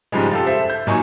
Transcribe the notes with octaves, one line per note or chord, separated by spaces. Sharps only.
G#2 C#3 F3 G3 G#3
F4 G4 A4
C5 E5
G6
A#2 F#3 D#4 G#5 C#6